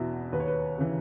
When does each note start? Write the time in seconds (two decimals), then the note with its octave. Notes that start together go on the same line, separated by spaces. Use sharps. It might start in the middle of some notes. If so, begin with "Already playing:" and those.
Already playing: E2 B2 E4
0.32 D#2 B4
0.40 C#5
0.48 B4
0.78 C#3 E3